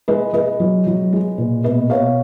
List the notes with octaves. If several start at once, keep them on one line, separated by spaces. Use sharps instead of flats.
G#3 B4 D#5
G#3 B4 D#5
F#3
F#3
G#3
A#2
B2 B4 D#5
B2 C#5 F5